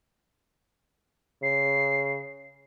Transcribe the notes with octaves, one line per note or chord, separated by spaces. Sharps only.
C#3 C7